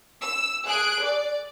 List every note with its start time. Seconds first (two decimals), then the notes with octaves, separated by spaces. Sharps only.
0.21 E6
0.66 G#4 F#6 D7
1.04 D5